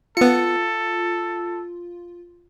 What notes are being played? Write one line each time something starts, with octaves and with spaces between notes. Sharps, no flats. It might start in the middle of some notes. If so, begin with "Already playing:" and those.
B3 F4 A4 C#7